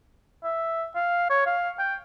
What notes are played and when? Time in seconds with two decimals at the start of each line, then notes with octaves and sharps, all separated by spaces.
0.44 E5
0.95 F5
1.30 C#5
1.46 F5
1.79 G5